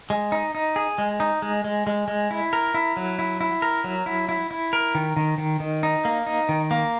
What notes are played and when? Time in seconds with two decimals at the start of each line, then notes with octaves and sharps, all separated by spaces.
0.10 G#3
0.32 D#4
0.55 D#4
0.76 G#4
0.98 G#3
1.20 D#4
1.42 G#3
1.64 G#3
1.87 G#3
2.08 G#3
2.31 E4
2.53 A#4
2.74 E4
2.97 F#3
3.19 E4
3.41 E4
3.62 A#4
3.84 F#3
4.06 E4
4.29 E4
4.51 E4
4.73 A#4
4.95 D#3
5.17 D#3
5.38 D#3
5.60 D#3
5.83 D#4
6.05 A#3
6.27 D#4
6.49 D#3
6.71 A#3